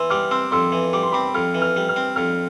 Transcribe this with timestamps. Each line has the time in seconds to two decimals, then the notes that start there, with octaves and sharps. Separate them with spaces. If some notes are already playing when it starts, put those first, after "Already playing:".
Already playing: E3 C6 E6
0.10 G3 D6 F6
0.31 C4 C6 E6
0.51 F2 C6 E6
0.72 E3
0.93 G3 D6
1.03 C6
1.12 C4 B5 D6
1.35 F2 F6
1.55 E3
1.62 F6
1.76 G3
1.89 F6
1.96 C4
2.16 F2 F6